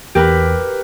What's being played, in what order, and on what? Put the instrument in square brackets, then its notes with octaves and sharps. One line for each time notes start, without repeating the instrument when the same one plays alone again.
[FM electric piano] E2 [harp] G4 A#4 B4